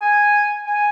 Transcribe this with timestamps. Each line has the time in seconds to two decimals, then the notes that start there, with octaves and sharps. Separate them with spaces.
0.02 G#5
0.66 G#5